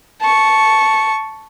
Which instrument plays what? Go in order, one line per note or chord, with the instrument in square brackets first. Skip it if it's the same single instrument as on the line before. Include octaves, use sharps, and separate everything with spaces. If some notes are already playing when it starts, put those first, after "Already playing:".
[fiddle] A5 C#6